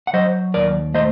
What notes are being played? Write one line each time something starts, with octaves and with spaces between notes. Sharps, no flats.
F#5
F#3 C5 D#5
D#2 A#4 D5
A3 C5 D#5